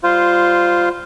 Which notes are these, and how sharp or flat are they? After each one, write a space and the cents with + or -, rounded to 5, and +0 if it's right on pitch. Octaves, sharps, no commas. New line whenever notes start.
G3 +0 F4 +0 C5 -10